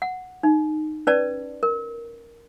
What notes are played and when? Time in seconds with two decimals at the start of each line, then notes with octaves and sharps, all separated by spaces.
0.02 F#5
0.43 D#4
1.07 C#4 B4 D5 A5
1.63 A#4